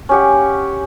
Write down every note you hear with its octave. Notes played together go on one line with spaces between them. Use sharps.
C#4 G4 F#5